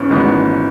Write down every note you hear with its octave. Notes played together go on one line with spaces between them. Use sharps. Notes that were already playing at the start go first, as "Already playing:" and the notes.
Already playing: G#1 G#2 E3 B3 C#4
G#1 G#2 E3 B3